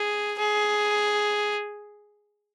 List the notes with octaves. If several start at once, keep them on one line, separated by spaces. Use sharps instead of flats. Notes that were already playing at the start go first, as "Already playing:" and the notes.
Already playing: G#4
G#4